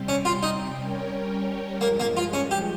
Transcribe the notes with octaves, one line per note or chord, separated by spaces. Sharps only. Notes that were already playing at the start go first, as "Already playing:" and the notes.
Already playing: C3 G3 C4 G4
C#4
F4
D#4
G3 C#4 G4 A#4 C#5
G2 F3 G#3 A#3
A#3
F4
C#4
G4